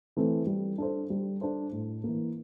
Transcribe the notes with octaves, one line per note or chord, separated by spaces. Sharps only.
E3 A3 C4 E4
G3
D4 A4 C5
G3
D4 A4 C5
A2
E3 A#3